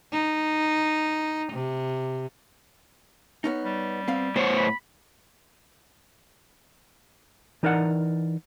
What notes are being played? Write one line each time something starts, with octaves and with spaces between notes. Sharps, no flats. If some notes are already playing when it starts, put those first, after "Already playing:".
D#4
C3
B3 C#4 D#4
G3
B3 C4 F5
A2 B3 C5 C#5
B5
E3 D#4 A#4 D5 E5 F#5